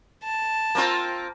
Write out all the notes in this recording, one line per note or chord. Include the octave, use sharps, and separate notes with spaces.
A5
A#3 C4 F4